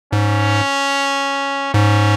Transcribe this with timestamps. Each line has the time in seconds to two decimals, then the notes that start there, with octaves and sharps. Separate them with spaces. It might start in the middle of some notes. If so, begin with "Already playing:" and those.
0.12 G#2 C#4
1.74 G#2 C#4